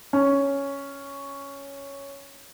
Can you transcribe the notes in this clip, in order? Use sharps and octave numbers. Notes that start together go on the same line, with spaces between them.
C#4